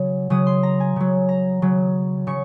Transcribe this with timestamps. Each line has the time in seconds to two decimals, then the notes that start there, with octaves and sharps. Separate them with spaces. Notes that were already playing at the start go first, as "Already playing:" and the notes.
Already playing: C#3 F#3
0.30 C#3 F#3 D#6
0.47 C6
0.63 A#5
0.80 G#5
0.96 C#3 F#3
1.29 A#5
1.62 C#3 F#3
2.27 C#3 C#6